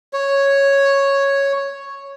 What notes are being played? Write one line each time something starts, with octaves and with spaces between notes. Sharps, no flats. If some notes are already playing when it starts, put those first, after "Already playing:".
C#5